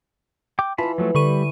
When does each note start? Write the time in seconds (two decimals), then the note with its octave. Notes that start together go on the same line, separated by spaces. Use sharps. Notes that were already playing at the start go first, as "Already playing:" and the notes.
0.59 G5 D6
0.78 E3 E4 F4 A5 B5
0.98 F3 F#3 A3
1.15 D3 G3 B5 C#6 D#7